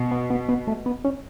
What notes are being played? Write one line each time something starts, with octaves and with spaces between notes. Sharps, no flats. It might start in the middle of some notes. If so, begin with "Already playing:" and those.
Already playing: B2
B3
B3
B3
A3
B3
C#4